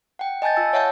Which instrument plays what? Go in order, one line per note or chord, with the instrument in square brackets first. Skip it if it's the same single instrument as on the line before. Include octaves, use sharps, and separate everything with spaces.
[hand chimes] F#5 G5
D#5 G#5 A5 G6 A6
F4 E6 C#7
C#5 E5 F#5 A5 G6